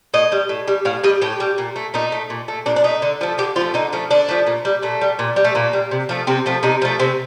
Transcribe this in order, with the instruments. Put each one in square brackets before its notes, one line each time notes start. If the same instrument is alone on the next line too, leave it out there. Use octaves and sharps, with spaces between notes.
[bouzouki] A2 D#5
G3
A2
G3
A2 F5
G3 D#5
A2 G4
G3
A#2
A3
A#2 D#4
A3
A#2
A3
A#2 D4
D4
A3 D#4
D3
F3 A3
D3 G4
F3 A3 F4
D3 D#4
F3 A3
D3 D4
F3 A3
A#2
G3
A#2 A3
G3
A#2
G3
A3
A#2 A#3
G3
C3
F3 A3
C3 C4
F3 A3
C3 D#4
F3 A3
C3 C4